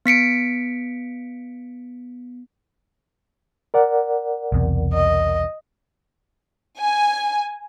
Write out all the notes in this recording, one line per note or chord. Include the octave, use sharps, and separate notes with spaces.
B3 B6 C#7 D7
A#4 D5 F#5
B1 E2 C3
D#5
G#5